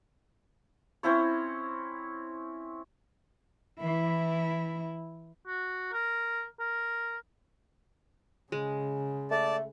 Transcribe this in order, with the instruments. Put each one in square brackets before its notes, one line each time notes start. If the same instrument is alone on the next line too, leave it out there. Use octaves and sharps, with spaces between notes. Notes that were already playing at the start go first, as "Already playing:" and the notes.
[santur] C4 C#4 E4 C#5
[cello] E3 E4
[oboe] F#4
A#4
A#4
[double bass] C#3 [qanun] G#3
[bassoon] A3 [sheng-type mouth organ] D5 A5